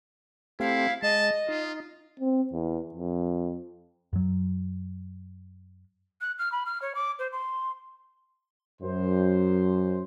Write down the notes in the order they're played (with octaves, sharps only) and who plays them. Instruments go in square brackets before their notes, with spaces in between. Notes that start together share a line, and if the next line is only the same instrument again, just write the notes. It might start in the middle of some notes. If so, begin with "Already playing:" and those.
[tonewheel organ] A3 C4 G4 [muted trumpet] E4 [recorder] F5
[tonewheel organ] G#3 [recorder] D#5 [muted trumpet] A5
[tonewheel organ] D#4 [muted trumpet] F4
[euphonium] C4
E2
F2
[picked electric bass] F#2 F#3
[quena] F#6
F6
B5
F6
C#5
D6
C5
C6
[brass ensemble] F#2 C5